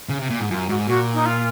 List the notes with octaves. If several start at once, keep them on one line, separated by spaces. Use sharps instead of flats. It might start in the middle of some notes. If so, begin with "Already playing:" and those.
C#3
C3
A#2
G#2
F#2 F4
G#2 F#4
A#2 F#4
D#4
F4